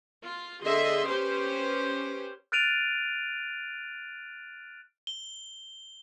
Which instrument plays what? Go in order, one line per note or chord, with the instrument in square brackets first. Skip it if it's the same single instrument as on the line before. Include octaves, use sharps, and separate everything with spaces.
[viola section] F4
D3 G#4 D#5 E5 C6
C#4 G4 B4 C5
[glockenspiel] F6 F#6 A6 D7 D#7 F7
[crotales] G7